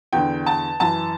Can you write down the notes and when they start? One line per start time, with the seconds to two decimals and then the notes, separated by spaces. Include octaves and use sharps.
0.13 E2 D3 G5
0.46 A5
0.80 F#2 E3 A5